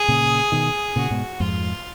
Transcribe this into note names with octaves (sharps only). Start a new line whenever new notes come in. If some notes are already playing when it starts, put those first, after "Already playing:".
Already playing: G#4
A#2 C#3
B2 D#3
A#2 C#3 F#4
G#2 B2
F2 G#2 F4